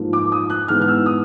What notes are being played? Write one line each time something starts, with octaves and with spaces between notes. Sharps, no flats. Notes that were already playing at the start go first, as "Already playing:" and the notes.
Already playing: G#2 F3 A#3
D6
D#6
F#6
G#2 E3 G#3 B3 F6
F6
E6
D#6